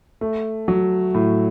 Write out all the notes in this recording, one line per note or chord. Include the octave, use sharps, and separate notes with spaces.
A3
F#3
A2